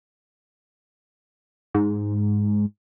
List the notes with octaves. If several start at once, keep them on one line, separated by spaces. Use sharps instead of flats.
G#2